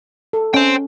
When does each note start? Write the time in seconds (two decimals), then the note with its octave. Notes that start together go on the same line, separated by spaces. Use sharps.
0.33 A4
0.54 C#4 C5 G5